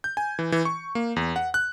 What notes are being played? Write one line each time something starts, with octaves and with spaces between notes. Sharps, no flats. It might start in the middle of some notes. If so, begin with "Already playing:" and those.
G6
G#5
E3
E3
C#6
A#3
E2
F#5
F#6